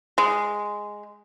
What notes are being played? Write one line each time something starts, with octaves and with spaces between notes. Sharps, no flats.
G#3